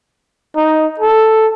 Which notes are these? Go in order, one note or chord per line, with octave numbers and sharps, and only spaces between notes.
D#4
A4